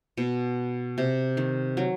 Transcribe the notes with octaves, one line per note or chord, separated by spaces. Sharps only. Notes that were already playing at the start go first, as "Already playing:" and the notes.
B2
C3
D#3
F#3